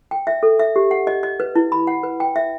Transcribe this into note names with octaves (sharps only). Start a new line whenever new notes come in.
G5
E5
A4
E5
G4
F#5
D#5
D#5
B4
E4
B5
F#5
B4
G5
E5